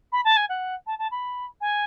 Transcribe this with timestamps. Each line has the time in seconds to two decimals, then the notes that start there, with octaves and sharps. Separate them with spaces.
0.12 B5
0.25 A5
0.37 G#5
0.49 F#5
0.87 A5
0.99 A5
1.11 B5
1.61 G#5